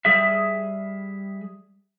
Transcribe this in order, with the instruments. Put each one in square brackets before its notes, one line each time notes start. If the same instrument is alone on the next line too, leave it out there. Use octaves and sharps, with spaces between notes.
[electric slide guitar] G3 G#4 E5